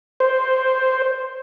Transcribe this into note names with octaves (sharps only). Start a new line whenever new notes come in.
C5